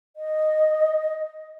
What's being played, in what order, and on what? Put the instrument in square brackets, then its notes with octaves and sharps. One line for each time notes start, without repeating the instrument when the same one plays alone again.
[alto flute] D#5